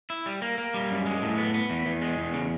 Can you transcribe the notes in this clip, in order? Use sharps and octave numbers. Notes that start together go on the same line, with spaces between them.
E4
G3
A#3
A#3
G3
F#2
G#3
A2
B3
B3
E2
E2
G#3
E2
C#3